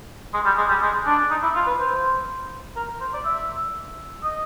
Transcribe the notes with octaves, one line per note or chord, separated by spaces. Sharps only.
G#3
G3
G#3
G3
G#3
D4
D#4
E4
F4
B4
C5
A#4
C5
D5
E5
D#5